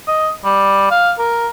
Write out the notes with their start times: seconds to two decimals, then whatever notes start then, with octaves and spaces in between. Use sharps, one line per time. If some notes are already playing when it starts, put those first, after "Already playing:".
0.08 D#5
0.44 G3
0.91 F5
1.18 A#4